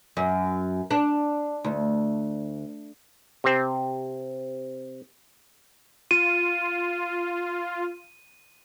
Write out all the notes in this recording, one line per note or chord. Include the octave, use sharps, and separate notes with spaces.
F#2
D4
D2
C3 C4
F4 D#7